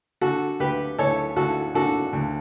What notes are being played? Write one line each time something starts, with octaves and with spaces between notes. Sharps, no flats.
D3 F#4 A4
D2 G4 B4
D2 A4 C#5
D2 F#4 A4
D3 F#4 A4
D2